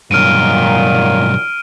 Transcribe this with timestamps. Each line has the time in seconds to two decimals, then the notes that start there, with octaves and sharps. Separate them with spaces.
0.11 B1 G2 A#2 D#3 F#3 F6 D7 D#7